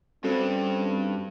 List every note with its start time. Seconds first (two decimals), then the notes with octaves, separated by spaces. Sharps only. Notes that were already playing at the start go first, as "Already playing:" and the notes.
0.24 G2 C4 C#4 F#4 A4